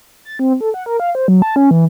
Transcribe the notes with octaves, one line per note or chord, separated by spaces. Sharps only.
A6
C4
A4
F#5
A#4
F5
C5
F#3
A5
C#4
E3